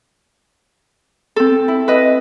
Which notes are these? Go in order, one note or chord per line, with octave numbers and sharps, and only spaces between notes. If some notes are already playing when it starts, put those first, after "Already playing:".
C4 A4
E4
B4 D#5